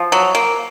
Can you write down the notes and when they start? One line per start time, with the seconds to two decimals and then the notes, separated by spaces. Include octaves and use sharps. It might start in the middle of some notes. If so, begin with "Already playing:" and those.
Already playing: F3
0.12 F#3
0.35 A#3